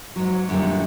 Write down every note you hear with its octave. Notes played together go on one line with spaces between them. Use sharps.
G#2 F#3
F#2 A#2 D3 D#3 G3